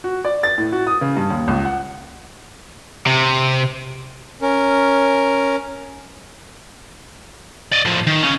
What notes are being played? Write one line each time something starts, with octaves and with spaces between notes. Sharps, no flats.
F#4
D5
A6
A2
F#4
D#6
C#3
G2
D#2
C#2
F#5
C3
C#4 A#4
D5 D#5
A2 F3
D#3
C#3 C#4